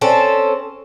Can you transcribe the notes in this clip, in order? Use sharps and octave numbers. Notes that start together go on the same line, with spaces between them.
C4 C#4 A4